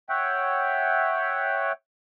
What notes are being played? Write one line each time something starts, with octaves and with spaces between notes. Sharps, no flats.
C#5 E5 F#5 G5